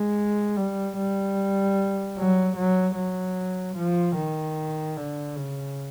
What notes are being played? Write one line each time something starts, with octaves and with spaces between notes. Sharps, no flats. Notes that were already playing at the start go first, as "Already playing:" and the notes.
Already playing: G#3
G3
G3
F#3
F#3
F#3
F3
D#3
D3
C#3